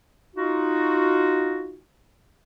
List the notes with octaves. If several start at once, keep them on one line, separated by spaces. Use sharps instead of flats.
D#4 F4 F#4